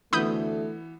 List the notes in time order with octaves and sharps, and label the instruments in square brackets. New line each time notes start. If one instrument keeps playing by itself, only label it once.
[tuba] D2 [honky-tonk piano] E3 B3 [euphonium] A3 [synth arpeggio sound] B5 D#6 G6